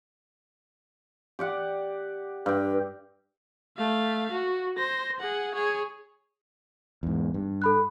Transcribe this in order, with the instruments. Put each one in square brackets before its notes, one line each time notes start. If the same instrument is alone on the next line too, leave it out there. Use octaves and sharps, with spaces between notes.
[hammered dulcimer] G4 D5 F#5
[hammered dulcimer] G2 G5 [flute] B4
[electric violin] A3 F5
F#4
C5 A#6
G#4 F#5
G#4 C#5
[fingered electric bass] E2 G#2
G2
[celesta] A4 B5 F#6